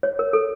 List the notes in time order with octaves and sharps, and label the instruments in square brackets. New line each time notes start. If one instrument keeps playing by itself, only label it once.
[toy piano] C#5
A#4
A4